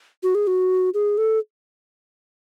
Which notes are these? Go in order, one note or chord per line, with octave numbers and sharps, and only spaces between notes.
F#4
G#4
F#4
G#4
A4